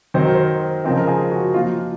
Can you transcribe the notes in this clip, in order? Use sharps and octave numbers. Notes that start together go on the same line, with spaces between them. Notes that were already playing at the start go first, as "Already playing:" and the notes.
D#3 F#3 C4 D#4 C5
A#4
C5
C#3 F3 C4 D#4 A#4
A#4
G#4
F#4
F3 A#3 D#4 F4
F4